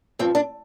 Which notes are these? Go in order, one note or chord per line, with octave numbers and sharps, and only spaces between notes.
G2 F3 C4
D4